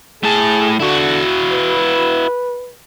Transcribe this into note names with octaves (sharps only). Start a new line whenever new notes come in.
A2 G#4 A5
D3 E4 F#4
B4